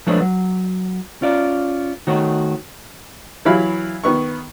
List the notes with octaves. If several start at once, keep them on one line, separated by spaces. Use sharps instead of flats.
F3 G#3 A3 D4 B4 C#5
F#3
C#4 F4 D5
D#3 A3 F#4 C#5
E3 F#3 E4 F5 B5
D#3 B3 C#6